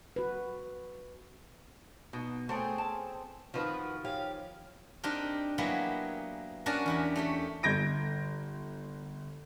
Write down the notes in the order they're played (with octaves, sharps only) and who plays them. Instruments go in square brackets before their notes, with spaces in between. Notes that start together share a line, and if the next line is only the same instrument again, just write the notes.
[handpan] F#4 B4
[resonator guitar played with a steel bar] B2 [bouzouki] D#4
[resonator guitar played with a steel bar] A3 G5 [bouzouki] C4 C#4 G#4
[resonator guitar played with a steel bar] A5
[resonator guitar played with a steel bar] D#3 F3 [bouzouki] F4 F#4 B4
[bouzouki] C#4 G4 F5
[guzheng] C4 D4 D#4 G4 A#4
F#3 A#3 B3 E4 G4 G#4
C#4 D4 F#4 A#4 D5 A5
E2 E4 G4
A3 G4 C#5
[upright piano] G1 G6 G#6 A#6 D7